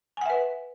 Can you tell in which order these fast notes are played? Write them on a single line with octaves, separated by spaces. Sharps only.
G#5 F#5 E5 B4